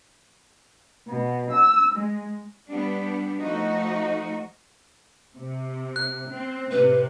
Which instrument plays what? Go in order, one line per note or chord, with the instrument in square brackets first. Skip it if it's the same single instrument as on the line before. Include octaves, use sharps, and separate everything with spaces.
[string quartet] B2
E6
G#3
[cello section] G3 B3 D4
F3 A3 D#4 F#4
C3
[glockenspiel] F#6
[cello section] C4
[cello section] A2 C3 [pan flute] B4